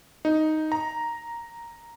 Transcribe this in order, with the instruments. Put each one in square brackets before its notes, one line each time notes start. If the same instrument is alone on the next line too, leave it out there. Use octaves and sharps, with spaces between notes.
[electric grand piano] D#4
A#5